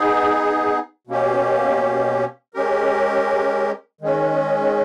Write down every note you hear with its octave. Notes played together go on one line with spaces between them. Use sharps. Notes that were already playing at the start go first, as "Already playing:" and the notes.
Already playing: B3 D#4 G#4
B2 A#3 C#4 G4
G#3 C#4 G4 A#4
D#3 G#3 C#4